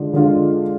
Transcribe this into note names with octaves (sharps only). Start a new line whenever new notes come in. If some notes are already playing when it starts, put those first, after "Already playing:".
Already playing: D3 G#3 D4 F4
D3 G#3 D4 F4